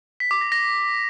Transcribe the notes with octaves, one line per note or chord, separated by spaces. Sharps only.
B6
D6
A#6
A#6